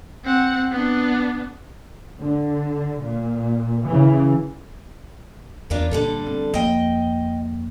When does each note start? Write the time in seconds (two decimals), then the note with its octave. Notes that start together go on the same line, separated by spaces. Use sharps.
0.24 C4 F#5
0.71 B3 D4
2.20 D3
3.01 A#2
3.85 C#3 E3
5.70 E2 D4 F4 A#4
5.91 A#2 D3 G3 A4
6.27 C4
6.54 F2 A#3 D#5 G5